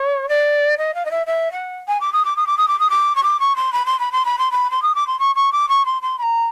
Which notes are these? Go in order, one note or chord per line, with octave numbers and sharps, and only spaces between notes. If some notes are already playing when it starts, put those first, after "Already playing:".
Already playing: C#5
D5
D#5
F5
D#5
E5
E5
F#5
G#5
D6
D#6
D6
D#6
D6
D#6
D6
D#6
D6
C#6
D6
C#6
C6
B5
C6
B5
C6
B5
C6
B5
C6
D#6
D6
C6
C#6
C#6
D6
C#6
C6
C6
B5
A#5